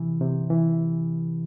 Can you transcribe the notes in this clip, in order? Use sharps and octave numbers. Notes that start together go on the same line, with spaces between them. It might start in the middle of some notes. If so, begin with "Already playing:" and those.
Already playing: C3 E3
C3
E3